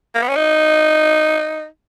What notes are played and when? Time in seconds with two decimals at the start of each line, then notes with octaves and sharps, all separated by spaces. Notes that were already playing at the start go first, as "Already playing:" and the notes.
0.15 A#3
0.23 B3
0.29 C#4
0.37 D#4